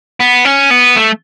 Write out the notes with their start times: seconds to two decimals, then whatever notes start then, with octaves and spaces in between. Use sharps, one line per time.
0.20 B3
0.45 C#4
0.71 B3
0.96 A3